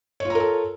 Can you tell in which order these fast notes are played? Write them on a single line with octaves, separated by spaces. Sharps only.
C#5 F4 A#5 A#4 A4